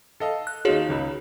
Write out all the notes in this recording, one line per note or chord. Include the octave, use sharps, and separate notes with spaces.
A4 D#5 F5
F#6
D#2 D#4 F4 F#4 G#4 C#5
C#2 C#3